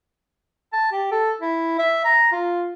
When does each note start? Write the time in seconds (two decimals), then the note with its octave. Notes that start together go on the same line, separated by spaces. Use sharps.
0.73 A5
0.92 G4
1.11 A4
1.41 E4
1.79 E5
2.05 A#5
2.32 F4